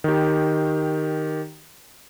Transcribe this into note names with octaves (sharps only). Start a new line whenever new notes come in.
D#3 G4